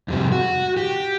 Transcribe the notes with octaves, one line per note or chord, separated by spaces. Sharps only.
F2 G#2 C3 G3
F#4
G4